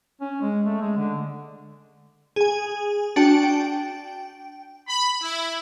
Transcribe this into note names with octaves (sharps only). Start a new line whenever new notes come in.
C#4
G#3
A3
G#3
D3
G#4 G#5
D4 F#4 G5 A5 D7
G5
B5
E4